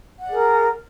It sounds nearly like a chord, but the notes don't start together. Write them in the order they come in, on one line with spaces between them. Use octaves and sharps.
F#5 D5 G#4 A#4